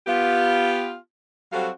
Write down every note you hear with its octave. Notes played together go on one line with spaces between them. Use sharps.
B3 F4 G4
F#3 G3 C4 F#4 A4 F5